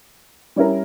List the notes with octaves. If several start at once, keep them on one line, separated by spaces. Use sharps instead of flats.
G3 C#4 E4 A#4